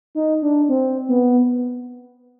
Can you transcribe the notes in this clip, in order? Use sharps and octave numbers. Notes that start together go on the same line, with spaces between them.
D#4
D4
C4
B3